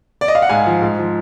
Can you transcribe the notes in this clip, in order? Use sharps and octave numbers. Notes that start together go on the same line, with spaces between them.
D5
D#5
F5
F#5
G#2 F5 G#5
F3
G#2
F3